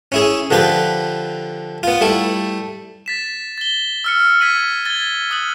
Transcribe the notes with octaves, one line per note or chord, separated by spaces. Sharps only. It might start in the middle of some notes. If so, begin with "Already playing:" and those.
C#4 E4 G#4
D3 F3 G4 B4
B3 F4
G3 A3 E4
A6 B6 E7
A6 G7
E6 F6 C#7
F6 G#6 B6 D#7 F#7
G#6 A6 G7
D#6 F6 F#6 F#7